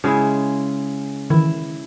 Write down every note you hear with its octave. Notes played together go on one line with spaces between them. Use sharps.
C#3 G#3 E4
D#3 E3 E4